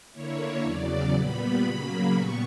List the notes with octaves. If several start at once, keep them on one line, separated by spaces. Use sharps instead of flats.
D3 A#3 E4 C#5
E2 C#3 F#3 D5
A#2 G3 B3 B5
C#3 F#3 A#3 B5
A#2 G3 B3 C#6